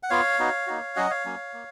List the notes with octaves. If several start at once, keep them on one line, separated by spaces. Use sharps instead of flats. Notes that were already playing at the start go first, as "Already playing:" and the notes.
F#5
B3 F4 C#5 F5
B3 D#4 F#4
A#3 D#4 F#4
F#3 C#4 F#4 D#5 F#5
C#5 F5
F#3 A#3 C#4
A#3